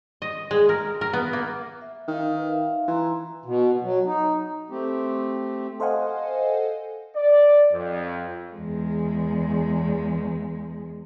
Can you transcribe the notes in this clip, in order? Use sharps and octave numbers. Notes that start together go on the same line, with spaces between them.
D#5
G#3
A#4
A#4
B3
A#3
E5
D#3 A#4 F5
B4
E5 F5
E3 A#5 C6
B2
F#3
D#4
A3 C4 G4
A4 C5 D#5 F5 F#5 G#5
D5
F2
E2 G#3